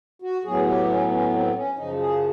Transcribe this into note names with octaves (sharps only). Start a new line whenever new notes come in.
F#4
A2 F#3 B3 G#4
G4
C#4
C#4
C4
C#4
F#2 C#3 F3 D#4
G#4